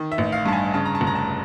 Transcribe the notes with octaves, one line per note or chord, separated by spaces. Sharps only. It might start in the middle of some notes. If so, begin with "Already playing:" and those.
Already playing: D#3
E5
A1
F5
G2 A5
G#5
C#3 A5
A#5
A5
F1
A#5
A5